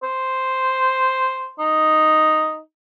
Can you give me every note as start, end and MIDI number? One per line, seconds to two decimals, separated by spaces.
0.03 1.53 72
1.59 2.59 63